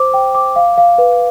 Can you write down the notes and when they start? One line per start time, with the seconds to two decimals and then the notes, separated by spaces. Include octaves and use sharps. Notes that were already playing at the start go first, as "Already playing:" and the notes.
Already playing: C5 D6
0.14 G5
0.35 D6
0.56 F5
0.78 F5
0.98 B4